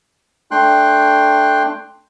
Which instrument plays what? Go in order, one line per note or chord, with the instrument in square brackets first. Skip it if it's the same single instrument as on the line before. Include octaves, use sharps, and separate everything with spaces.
[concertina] A3 D4 G5 C6 F#6